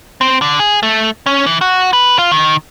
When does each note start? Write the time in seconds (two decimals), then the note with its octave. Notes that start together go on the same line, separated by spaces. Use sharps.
0.21 C4
0.42 D3
0.59 G#4
0.83 A3
1.26 C#4
1.46 E3
1.61 F#4
1.93 B4
2.18 F4
2.32 D#3